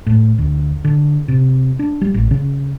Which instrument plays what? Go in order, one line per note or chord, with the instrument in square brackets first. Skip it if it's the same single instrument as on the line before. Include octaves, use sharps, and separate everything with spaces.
[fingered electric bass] A2
D2
D3
C3
D4
G3
A1
C#3